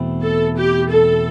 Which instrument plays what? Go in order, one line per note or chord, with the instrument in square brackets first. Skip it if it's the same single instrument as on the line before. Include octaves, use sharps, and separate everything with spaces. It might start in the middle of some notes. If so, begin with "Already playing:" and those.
Already playing: [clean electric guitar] E2 B2 A3 C4 E4
[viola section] A4
G4
A4